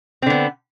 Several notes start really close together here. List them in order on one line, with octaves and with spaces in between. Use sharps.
C4 D3 B3